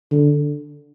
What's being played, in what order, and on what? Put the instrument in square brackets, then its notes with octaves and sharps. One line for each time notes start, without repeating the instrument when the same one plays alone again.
[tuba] D3